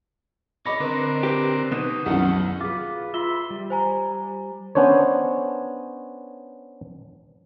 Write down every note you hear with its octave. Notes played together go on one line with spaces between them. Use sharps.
C#5 D#5 B5 D6 A#6
D3 C4 A#4 B4
G4 B4
B2 D#4
C2 F#2 D#3 F#5
F4 G#4 B4 D6
F4 E5 B5 C6 G7
G3
C5 G#5 A#5
B3 C#4 D4 C5 C#5